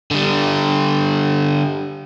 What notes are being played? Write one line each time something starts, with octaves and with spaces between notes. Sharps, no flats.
D3 G3